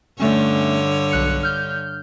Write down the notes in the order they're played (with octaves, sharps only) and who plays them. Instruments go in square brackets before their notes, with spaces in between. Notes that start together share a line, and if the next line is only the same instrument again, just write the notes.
[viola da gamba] G2 D3 C#5 [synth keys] A3 C#4
[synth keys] B1 F#6 C#7
F6 G6